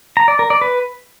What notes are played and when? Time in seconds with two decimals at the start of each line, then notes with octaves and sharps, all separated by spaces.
0.17 A#5
0.28 D5
0.39 A#4
0.50 D5
0.61 B4